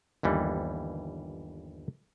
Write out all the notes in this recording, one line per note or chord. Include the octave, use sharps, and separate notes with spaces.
G1 D#2 E3 G3